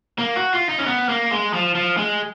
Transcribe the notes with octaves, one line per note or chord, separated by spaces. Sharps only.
A#3
F#4
F4
D#4
C#4
B3
A#3
G#3
F3
F3
G#3